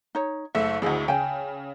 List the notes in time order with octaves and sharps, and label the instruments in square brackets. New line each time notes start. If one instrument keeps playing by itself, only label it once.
[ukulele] D#4 C#5
[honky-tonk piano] F#1 A3 E6 [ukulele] E5
[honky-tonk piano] G#1 D2 [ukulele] E4 G#4 D#5
[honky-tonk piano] C#3 [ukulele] G5 G#5